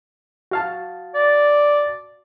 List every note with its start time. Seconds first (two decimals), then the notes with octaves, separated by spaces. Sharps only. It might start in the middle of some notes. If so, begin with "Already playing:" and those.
0.51 F#4 F5 A5
1.14 D5